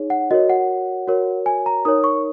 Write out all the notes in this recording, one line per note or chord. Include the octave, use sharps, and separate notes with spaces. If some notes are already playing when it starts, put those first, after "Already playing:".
Already playing: D#4 G#4 C#5
F#5
F#4 A#4 C#5 D#5
F#5
F#4 A#4 C#5
G#5
A#5
D#4 A#4 C#5 D#6
C#6